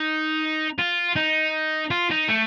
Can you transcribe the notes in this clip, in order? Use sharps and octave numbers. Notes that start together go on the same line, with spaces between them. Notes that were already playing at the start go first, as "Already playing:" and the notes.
Already playing: D#4
F4
D#4
F4
D#4
A3